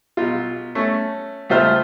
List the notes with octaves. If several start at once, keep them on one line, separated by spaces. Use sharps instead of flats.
B1 F4
A3 C#4
C#2 A3 F4 C5 E5 F6